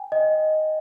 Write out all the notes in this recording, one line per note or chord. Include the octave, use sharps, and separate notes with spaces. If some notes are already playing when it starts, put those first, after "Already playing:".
Already playing: G5 G#5
D#5